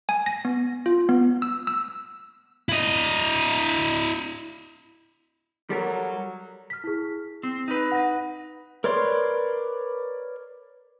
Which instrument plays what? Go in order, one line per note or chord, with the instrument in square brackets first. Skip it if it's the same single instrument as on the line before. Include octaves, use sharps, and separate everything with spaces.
[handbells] G#5
A#6
B3
F4
B3
E6
E6
[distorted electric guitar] E4 D#5
[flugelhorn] F#3 [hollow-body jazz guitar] G3 A4 A#4
[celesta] F6 B6
E4 G#4
[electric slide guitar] C4
D#4 B4
[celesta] F#5 A#6
[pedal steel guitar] A#4 B4 C#5 D5 C6